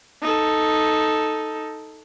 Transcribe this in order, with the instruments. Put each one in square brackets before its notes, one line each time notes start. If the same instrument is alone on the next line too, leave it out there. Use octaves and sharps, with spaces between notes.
[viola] D#4 A4